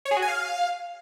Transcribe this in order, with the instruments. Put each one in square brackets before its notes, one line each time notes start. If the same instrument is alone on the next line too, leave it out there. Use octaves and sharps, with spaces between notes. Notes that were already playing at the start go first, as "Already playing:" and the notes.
[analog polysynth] C#5
G#4
F#4
G#5
F5